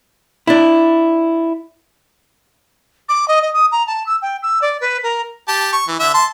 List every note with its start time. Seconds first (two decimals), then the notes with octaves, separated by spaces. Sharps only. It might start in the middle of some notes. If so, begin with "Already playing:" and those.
0.47 D4 E4
3.09 D6
3.28 D#5
3.42 D#5
3.53 D#6
3.72 A#5
3.87 A5
4.06 E6
4.22 G5
4.42 E6
4.62 D5
4.81 B4
5.03 A#4
5.48 G4 A5
5.73 C#6
5.88 E3
6.00 D3 E5
6.14 A5 C6